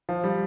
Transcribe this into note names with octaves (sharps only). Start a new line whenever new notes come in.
F3
G3